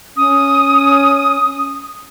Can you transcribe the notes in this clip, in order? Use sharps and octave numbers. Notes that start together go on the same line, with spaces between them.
C#4 D#6